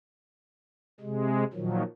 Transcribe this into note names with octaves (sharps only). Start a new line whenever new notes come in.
C3 G#3
A#2 D#3 F3 F#3